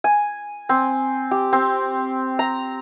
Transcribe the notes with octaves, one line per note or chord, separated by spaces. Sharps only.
G#5
C4
G4
C4
A#5